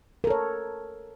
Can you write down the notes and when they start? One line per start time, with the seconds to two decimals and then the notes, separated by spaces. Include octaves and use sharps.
0.24 A#4
0.27 A4
0.30 C#5